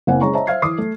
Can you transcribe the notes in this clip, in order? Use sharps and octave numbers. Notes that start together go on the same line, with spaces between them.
F#1 A#3 C4 F#5 G#5
C#3 G#3 C#5 A#5 C#6
C5 C#5 D#5 E5 A5 A#5
C5 E5 F5 F6 G#6 C7
E3 D6 D#6 C7
A3